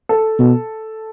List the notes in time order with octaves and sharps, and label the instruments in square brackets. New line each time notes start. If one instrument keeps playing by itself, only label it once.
[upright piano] A4
[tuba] B2